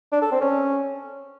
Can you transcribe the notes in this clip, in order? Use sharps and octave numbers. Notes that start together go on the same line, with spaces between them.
D4
A4
C4
C#4